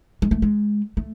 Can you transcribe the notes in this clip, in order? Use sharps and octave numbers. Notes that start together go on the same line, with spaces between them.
G#3
A3
G#3
A3